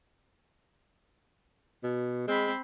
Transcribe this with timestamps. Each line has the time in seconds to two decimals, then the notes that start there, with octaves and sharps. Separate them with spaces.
1.83 B2
2.27 G#3 C4 B5